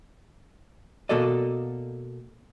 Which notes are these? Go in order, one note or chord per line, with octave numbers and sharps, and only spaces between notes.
B2 A#3 F#4 A4 D5 D#5